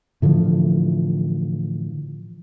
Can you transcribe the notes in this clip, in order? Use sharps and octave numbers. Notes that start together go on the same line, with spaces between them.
A2 D3 E3 F3